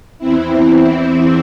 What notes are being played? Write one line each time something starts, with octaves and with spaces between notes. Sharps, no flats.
E2 E3 C4 E4